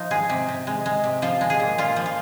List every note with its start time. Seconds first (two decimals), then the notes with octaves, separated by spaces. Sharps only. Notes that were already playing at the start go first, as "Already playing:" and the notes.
Already playing: F3 D#4 F4
0.11 G#3 G#4
0.29 C3
0.48 C3
0.67 G#3
0.86 G#3
1.04 C3
1.22 F3 F4
1.41 G#3
1.50 G#4
1.60 A#2
1.78 A#2 F4
1.96 F3
2.06 F4